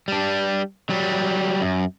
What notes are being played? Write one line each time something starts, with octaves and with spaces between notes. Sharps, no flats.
G3 D4
F#3 G3
F#2